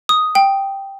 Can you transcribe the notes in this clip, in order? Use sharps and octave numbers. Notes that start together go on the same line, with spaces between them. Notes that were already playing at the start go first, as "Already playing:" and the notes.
D#6
G5